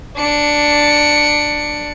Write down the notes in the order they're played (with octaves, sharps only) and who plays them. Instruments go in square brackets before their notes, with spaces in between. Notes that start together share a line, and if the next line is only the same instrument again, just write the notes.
[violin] D4 C#7